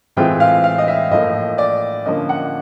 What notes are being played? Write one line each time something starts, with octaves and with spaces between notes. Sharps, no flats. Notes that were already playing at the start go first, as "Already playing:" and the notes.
A2 E3 G#3 C4 F4 G5
F5
F5
D#5
E5
A2 F3 A#3 D#5
D5
D3 F3 A#3 C#4 D#5
F#5